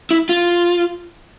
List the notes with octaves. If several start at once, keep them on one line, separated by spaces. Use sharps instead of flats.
E4
F4